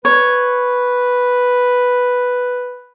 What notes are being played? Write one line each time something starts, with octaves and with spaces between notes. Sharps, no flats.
B4 C#5